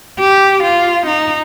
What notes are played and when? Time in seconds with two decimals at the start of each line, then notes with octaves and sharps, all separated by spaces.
0.19 G4
0.63 F4
1.06 D#4